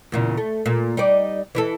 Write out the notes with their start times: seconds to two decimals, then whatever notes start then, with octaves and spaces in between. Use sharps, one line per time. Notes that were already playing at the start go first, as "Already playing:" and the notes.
0.12 E2 A#2 C#3
0.37 A3
0.66 A#2
0.97 G3 D#4 D5
1.55 E3 E4 A4